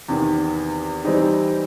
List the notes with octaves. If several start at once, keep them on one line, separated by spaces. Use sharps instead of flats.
E2 C3 D#3
E3 G3 C4 D#4 G4